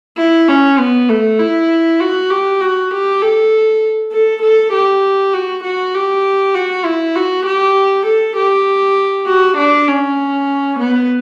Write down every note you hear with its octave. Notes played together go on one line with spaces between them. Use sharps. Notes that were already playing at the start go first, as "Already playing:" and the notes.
E4
C#4
B3
A3
E4
F#4
G4
F#4
G4
A4
A4
A4
G4
F#4
F#4
G4
F#4
E4
F#4
G4
A4
G4
F#4
D4
C#4
B3